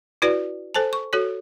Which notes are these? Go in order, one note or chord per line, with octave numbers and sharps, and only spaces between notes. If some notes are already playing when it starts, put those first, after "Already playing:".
E4 F#4 B4 D5
A4 C5 G#5 A5
C#6
F#4 A4 C#5